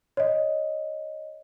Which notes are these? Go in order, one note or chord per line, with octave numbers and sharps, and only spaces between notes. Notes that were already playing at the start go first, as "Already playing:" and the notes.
C#5 D#5